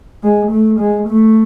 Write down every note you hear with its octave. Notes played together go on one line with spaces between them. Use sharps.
G#3
A3
G#3
A3